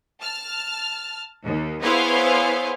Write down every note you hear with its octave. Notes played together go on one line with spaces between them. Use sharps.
A5 F6
D#2
B3 E4 G#4 C5 C#5 F5